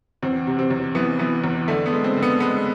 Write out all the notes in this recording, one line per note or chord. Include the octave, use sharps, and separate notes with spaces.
E2 C4
C3
C4
E2
E3 B3
E3 B3
E2
D3 A3
B3
G#3
C4
D3
B3
G#3 B3